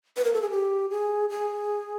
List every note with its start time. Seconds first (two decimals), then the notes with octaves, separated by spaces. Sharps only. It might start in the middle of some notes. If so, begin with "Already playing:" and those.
0.17 B4
0.24 A#4
0.33 A4
0.42 G#4
0.50 G4
0.90 G#4
1.30 G#4